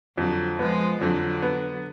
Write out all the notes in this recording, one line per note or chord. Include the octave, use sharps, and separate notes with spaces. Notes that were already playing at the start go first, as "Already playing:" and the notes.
F2 D3 F#3
F3 G#3 B3
F2 D3 F#3
B3